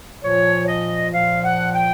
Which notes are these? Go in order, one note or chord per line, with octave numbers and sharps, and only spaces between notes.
A#2 F3 C#5
D#5
A#2 F3 F5
F#5
G5